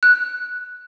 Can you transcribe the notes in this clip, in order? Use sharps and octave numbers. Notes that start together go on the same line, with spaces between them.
F#6